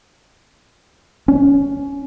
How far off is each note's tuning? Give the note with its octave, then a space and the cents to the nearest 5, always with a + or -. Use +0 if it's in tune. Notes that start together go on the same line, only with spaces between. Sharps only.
C#4 +15